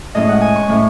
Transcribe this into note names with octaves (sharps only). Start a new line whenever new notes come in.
A2 G#3 C#4 D#5
F#5
G#5
C#6
A2 G#3 C#4